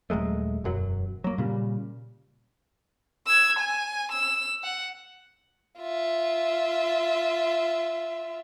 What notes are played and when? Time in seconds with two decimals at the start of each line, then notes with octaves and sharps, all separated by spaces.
0.10 D#1 F#3 G#3 A3
0.64 E1 F#2 F#3
1.24 F#3 A#3
1.38 A#2 C#3 G3
3.27 E6 G#6
3.59 G#5
4.12 E6
4.63 F#5
5.80 F4 E5